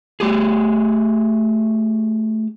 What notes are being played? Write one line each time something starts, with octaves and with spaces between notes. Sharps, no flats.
A3 G4 G#4